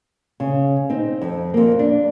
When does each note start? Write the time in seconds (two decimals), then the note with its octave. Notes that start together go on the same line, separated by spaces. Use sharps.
0.40 C#3
0.90 C4 D#4
1.21 F2
1.54 F2 A#3
1.79 D4